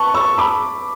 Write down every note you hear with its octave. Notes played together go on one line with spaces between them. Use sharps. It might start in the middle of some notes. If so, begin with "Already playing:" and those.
Already playing: B4 A5 C#6
C#6 E6
B5 D6